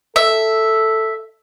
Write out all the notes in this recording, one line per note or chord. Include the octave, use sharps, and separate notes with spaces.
A4 E5